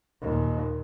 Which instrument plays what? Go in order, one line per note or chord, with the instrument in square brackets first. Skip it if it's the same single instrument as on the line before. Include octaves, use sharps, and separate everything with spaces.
[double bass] D#2 A#2